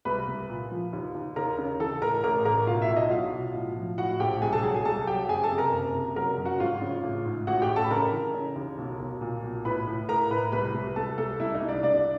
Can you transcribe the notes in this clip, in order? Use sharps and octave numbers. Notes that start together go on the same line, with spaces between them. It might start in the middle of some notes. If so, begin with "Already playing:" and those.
C2 B4 B5
C2
A#2
F3
D#2
D#2
D#2 A#4 A#5
C#3
E3 A4 A5
A2 A#4 A#5
A1 A#4 A#5
A1 A#4 A#5
B2 F4 F5
E4 E5
B1
D#4 D#5
F#3 F4 F5
B2
A2
F3
A2 F#4 F#5
A#1 G4 G5
C2 G#4 G#5
A4 A5
F#3 G#4 G#5
G#4 G#5
C2 A4 A5
F#3 G4 G5
F#1 G#4 G#5
A4 A5
C3
A#4 A#5
F#1
C3
F#3 A#4 A#5
F#2
F#4 F#5
G#1 F4 F5
C#3
A1
G#2
A1 F#4 F#5
G4 G5
A1
A4 A5
B5
C#3 A#4 A#5
E3
C#3
D#2
B1
B1
A#2
B1
A2 B4 B5
A2
A2 A#4 A#5
A2 B4 B5
C2 B4 B5
C2
C2 A4 A5
C2 A4 A5
C2 E4 E5
D#4 D#5
C2
D4 D5
C2 D4 D5